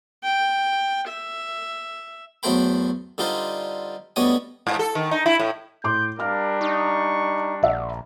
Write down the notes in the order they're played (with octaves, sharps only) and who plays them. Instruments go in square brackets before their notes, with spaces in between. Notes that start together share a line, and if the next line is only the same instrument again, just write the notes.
[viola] G5
E5
[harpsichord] E2 F#3 A3 C5 G5 B5
D3 G3 D#4 F4 C5
D2 G3 B3 C#5 D#5 D#6
[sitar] G#2
A4
D#3
D#4
E4
A2
[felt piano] A2 C6 D6 [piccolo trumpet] G6
[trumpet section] G3 D4 [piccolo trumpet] A#4 [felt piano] F5 F6
[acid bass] D#4 [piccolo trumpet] C#6
[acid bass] A#1 [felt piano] D5 E5 F#5